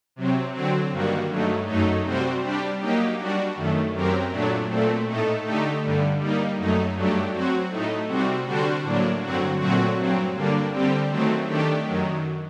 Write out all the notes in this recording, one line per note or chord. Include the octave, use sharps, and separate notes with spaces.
C3 F#3 C4
D3 F#3 C4
G2 D#3 G3 A#3 F#4
G2 F#3 A3 D#4
F#2 F#3 A3 D#4
C3 G3 C4 F#4 C5
G3 D4 G4
F#3 A#3 D#4 G4
G3 D4 F#4
F#2 D#3 A3
F#2 F#3 C4 G4 A#4
A#2 F#3 A3 D4
A#2 A3 C4
A2 A3 D#4 A4
D3 A3 D#4 G4
G2 D3 G3
G3 A#3 D#4
F#2 F#3 A3 D#4
G2 F#3 A3 D4 G4
F#3 C4 F#4
A2 A3 D#4
C3 G3 C4 F#4
D3 G3 D4 F#4 C5
A2 F#3 A#3 D4
G2 D3 F#3 C4 F#4
A#2 F#3 A3 C4 F#4
G2 F#3 C4
D3 G3 A#3 D4
D3 G3 C4 G4
D#3 F#3 A3 C4
D#3 A3 D4 G4
F#2 D#3 F#3